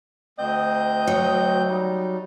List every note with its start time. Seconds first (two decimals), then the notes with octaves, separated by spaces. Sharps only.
0.39 D2 C4 D#5 G6
1.07 F#3
1.68 G3 D#4